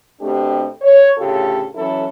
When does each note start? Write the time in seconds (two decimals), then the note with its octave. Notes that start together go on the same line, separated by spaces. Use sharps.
0.20 B2 A3 C4 D4 G4
0.81 C#5
1.18 D2 A2 C#3 F4 G4 A4
1.75 E3 F#3 C#4 E4 A4